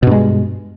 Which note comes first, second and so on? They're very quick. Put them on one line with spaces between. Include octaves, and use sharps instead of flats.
B2 G2 G#3